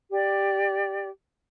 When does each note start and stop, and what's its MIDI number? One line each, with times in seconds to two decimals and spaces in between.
0.11 1.08 67
0.11 1.08 74